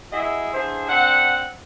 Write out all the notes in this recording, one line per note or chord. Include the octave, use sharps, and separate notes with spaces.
E4 F#4 G#4 D#5 E5
D3 E3 G#4 C5
C4 D4 F#5